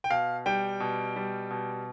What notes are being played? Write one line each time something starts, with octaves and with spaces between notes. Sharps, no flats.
G5
B2 F5
G3 G5
B2
G3
B2